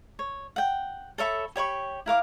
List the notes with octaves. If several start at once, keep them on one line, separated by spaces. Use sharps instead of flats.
C#5
F#5 G5
A4 C#5 E5 B5
G4 C#5 B5 C#6
E4 A#4 F5 D6